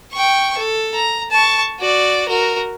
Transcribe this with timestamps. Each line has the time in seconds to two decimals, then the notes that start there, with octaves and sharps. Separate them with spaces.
0.13 G5 C#6
0.58 A4
0.95 A#5
1.31 A5 C#6
1.80 F#4 D5
2.28 F#4 A#4